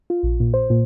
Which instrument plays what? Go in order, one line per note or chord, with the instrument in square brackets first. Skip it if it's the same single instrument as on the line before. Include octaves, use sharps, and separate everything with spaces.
[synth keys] F4
A#1
A#2
C5
A#2